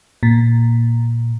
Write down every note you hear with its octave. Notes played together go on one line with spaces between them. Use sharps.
A#2